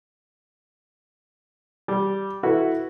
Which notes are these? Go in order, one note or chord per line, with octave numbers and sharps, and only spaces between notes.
G3
E4 F#4 A4 B4